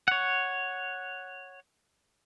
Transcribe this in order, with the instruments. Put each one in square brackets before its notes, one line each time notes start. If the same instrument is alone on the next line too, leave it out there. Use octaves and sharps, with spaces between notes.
[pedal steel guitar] C#5 F#5